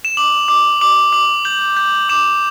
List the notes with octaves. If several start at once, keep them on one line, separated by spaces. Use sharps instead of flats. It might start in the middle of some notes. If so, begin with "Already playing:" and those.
E7
D6 F#7
D6
D6 F#7
D6 F#7
G6 F#7
G6
D6 E7